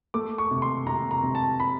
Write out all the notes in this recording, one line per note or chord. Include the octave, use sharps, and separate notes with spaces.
A3 D6
C#6
C3
C6
C3 A#5
A#5
C3
A5
B5